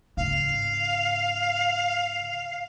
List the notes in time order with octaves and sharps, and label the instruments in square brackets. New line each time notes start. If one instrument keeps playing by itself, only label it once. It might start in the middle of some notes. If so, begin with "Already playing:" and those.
[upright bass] G#2 C#3 [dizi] F5